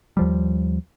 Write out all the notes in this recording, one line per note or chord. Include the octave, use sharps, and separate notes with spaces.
D#2 F3 G3